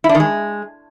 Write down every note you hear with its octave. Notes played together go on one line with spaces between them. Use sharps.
E4
D4
D#3
G#3